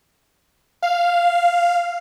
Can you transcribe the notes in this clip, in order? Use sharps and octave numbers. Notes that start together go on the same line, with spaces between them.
F5